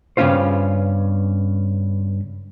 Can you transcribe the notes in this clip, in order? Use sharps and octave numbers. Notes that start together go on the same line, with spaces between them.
G2 C#3 B3 C#4 F4 C5